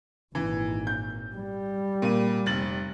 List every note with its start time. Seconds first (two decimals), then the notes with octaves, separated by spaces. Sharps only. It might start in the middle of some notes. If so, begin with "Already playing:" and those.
0.35 G#1 A#2 E3
0.87 G6
1.36 G3
2.02 A#2 D#7
2.46 F1 A6 F#7